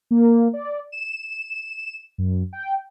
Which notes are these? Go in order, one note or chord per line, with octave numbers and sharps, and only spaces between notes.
A#3
D5
E7
F#2
G5